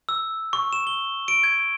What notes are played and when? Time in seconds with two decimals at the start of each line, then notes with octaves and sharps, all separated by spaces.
0.09 E6
0.53 C#6
0.73 E7
0.87 G7
1.28 D7
1.44 G#6